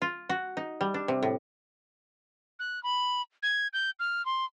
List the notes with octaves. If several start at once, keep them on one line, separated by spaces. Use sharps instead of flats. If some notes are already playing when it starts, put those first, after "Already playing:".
F4
F#4
D#4
G3
D4
C3
A2
F#6
B5
G#6
G6
F6
C6